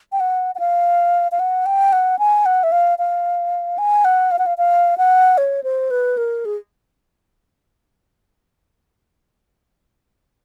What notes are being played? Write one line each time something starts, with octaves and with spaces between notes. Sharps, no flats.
G5
F#5
F#5
F5
F5
F#5
G5
F#5
G#5
F#5
E5
F5
F5
G#5
F#5
F5
F#5
F5
F5
F#5
C#5
C5
B4
A#4
G#4